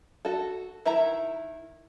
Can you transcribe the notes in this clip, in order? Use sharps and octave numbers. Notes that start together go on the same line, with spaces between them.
F#4 A4
D#3 E4 E5 A#5